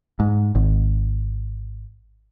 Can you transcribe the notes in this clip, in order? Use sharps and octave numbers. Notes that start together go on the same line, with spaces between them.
G#2
G#1